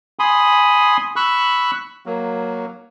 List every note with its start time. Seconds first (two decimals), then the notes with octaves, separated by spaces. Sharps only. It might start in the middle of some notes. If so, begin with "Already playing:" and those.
0.19 G#5 B5 C6 D#6
1.16 B5 C#6 E6 F#6
2.06 F#3 A#3